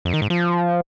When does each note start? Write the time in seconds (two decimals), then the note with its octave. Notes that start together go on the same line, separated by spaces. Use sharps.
0.05 F2
0.14 D#3
0.22 G#2
0.30 F3